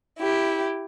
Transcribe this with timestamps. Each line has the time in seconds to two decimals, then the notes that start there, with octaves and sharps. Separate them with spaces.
0.19 E4 G4